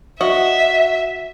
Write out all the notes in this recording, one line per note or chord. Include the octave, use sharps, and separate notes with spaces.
F#4 D#5 E5